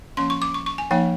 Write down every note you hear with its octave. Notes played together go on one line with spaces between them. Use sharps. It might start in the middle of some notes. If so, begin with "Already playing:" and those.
F3 A#3 C#4 C6
C#6
D6
C#6
C#6
G#5
F3 A#3 D#4 G5